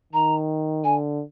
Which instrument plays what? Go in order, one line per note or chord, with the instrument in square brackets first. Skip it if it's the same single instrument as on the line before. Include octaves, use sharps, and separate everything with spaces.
[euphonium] D#3 [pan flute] A#5
[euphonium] D3 [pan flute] G#5